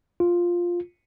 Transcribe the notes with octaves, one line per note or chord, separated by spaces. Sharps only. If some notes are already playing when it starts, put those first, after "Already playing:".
F4